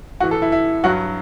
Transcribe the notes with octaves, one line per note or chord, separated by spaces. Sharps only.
A2 E3 F#4
A4
E4
E4
G2 F#3 F#4